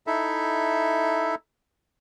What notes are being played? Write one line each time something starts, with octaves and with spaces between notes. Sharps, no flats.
D#4 E4 A4 E5